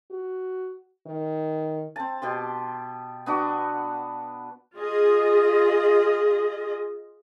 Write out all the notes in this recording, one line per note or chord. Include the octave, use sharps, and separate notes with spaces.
F#4
D#3
C4 A5
B2 G4 C6
B3 D4 F#4
F4 G#4 D#5